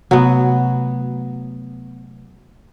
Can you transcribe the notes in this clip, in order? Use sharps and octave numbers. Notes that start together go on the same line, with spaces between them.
C3 F#3 A3 B3